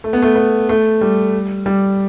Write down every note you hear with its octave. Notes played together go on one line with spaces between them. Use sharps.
A3
B3
A3
B3
A3
G3
G3